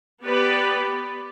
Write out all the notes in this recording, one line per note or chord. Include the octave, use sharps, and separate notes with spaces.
B3 G4 B4 D5